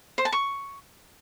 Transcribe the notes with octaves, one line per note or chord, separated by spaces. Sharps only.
C5
A5
C#6